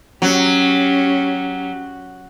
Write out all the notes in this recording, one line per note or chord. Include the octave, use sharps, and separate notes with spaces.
F#3 C#4 G4